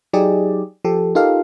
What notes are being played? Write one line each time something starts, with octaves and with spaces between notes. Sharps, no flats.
F#3 D#4 G4 G#4 D5
F3 G4 A4
D#4 F4 G4 A4 A#4 F5